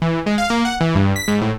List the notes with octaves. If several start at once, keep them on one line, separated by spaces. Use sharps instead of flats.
E3
G#3
F5
A#3
F#5
E3
G2
B6
G#2
A2